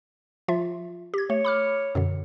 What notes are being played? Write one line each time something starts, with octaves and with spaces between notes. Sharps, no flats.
F3 F4 E5
G4 G#6
A3 C#5
B5 D6 F6
F#2 B2 D3